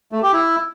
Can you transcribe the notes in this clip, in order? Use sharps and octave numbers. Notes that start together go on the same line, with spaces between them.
A3
G4
E4